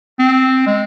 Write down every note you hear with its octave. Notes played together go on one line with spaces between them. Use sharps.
C4
G#3